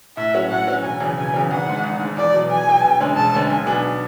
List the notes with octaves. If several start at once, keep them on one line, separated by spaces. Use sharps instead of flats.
A2 E5
F#3 C#4 F#4
A2 F#5
F#3 C#4 F#4
E1 G#5
E2 C#3 F#3 C#4
E1 G#5
E2 C#3 F#3 C#4
G#1 F#5
G#2 G#3
G#1
G#2 G#3
E2 D5
B2 F#3
E2 G#5
B2 F#3
E1
D2 D3 G#3 C#4
E1 A5
D2 D3 G#3 C#4
B1 G#5
B2 F#3 B3 D4